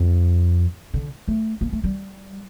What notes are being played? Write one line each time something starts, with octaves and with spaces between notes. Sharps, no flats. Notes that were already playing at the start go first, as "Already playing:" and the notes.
Already playing: F2
D3
A3
A#3
A3
G3